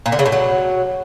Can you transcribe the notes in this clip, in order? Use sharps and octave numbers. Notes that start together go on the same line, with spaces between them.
A#2
D3
C#3
A2
F#3